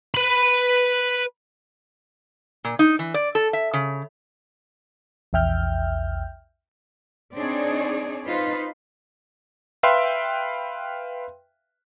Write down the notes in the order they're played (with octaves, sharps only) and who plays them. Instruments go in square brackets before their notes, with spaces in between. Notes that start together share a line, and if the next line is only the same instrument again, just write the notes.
[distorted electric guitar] B4 B5
[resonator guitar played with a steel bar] A#2
D#4
E3
D5
A4
E5
C#3
[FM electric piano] A#1 E2 E5 G5 F6 G6
[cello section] C4 D4 D#4 G#4 C#5 D5
D#4 F4 B4 C5
[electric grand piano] B4 E5 F5 G5 C6